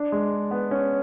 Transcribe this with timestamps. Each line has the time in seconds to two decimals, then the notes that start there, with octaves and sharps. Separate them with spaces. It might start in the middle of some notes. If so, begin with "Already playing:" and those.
Already playing: D4
0.12 G#3
0.51 B3
0.71 C#4